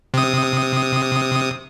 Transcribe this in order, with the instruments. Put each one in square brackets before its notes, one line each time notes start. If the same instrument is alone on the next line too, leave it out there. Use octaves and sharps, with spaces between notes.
[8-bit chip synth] C3 D#6